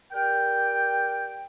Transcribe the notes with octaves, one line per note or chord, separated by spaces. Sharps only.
G4 A#4 D5 G5